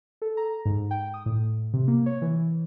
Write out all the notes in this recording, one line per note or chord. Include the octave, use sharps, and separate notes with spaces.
A4
A#5
G#2
G5
D#6
A2
C3
A#3
C#5
E3